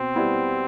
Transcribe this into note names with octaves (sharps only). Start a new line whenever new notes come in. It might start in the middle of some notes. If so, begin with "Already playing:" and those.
Already playing: B2 C4
G3 B3 E4